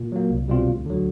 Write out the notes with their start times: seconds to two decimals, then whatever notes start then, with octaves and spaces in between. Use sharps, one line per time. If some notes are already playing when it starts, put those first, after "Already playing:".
Already playing: A#2
0.12 F#3 A#3
0.30 C2
0.48 B2 G3 C4 F4
0.67 D2
0.86 D3 F#3